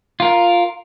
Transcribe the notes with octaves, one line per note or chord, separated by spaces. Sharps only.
F4 A#4